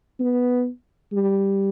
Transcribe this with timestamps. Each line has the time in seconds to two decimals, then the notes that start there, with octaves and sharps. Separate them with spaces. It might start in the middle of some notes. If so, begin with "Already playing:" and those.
0.19 B3
1.12 G3